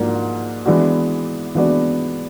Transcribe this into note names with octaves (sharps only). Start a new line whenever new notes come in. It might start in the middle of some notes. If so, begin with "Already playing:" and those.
Already playing: G#2 F3 A#3 D4 F#4
E3 G#3 B3 D4 F#4
E3 G#3 B3 D4 F#4